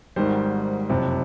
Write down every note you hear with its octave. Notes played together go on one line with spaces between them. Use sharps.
G#1 G#2 D#3 G3 C5
F#1 F2 C3